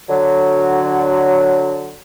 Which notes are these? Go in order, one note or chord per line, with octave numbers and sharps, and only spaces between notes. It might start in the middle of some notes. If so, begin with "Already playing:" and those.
D3 F#3